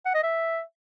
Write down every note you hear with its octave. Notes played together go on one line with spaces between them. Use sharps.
F#5
D#5
E5